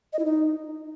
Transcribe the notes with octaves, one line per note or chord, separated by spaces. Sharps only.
D#5
E4
D#4